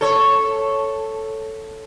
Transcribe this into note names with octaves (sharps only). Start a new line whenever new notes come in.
A4 C#5